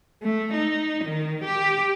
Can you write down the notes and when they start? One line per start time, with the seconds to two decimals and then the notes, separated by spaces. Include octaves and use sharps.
0.22 A3
0.53 D#4
1.04 D#3
1.44 G4